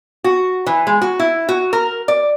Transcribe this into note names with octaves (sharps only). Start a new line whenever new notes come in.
F#4
E3
G#3
F#4
E4
F#4
A#4
D5